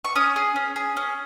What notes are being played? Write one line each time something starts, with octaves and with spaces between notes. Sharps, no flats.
C#6
C#4 D#6
G#4
C#4
G#4
C#4